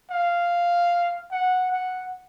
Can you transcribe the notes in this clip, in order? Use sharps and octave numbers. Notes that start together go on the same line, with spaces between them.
F5
F#5
F#5